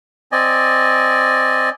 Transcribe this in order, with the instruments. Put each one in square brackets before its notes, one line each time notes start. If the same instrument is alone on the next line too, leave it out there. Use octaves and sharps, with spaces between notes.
[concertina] C4 D5 D#5 G#5